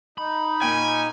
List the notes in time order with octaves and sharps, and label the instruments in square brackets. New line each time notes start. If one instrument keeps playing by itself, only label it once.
[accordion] D#4 [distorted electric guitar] B5
[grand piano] A#2 G5 G#6 [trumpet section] C#4 G#5